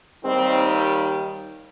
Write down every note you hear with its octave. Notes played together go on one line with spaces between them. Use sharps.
D#2 D#3 G3 C4